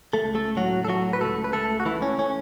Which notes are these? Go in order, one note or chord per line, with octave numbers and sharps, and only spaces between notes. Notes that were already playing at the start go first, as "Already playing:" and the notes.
A3 A4
C#2
A3 A4
A2 F#3 F#4
A4
F#3 A3 F#4
B4
C#2 A3 A4
B4
C#2 A3 A4
F#4
E3 A3 E4
C#4
E3 C#4